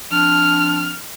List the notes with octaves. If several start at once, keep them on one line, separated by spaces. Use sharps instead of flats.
F3 C4 D4 F6